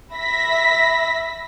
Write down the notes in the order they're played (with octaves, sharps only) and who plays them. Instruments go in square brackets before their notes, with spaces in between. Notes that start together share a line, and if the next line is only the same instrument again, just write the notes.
[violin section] E5 B5 A#6 B6